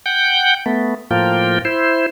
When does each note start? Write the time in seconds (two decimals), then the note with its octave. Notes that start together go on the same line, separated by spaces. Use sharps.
0.06 F#5 G5 G6
0.66 A3 B3
1.11 A2 F3 A#3 F4 G5
1.65 E4 C5